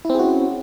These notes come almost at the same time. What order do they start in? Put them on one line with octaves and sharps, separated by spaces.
E4 C4 G#4 F#4 C#4